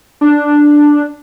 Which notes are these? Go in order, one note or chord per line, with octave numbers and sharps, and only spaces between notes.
D4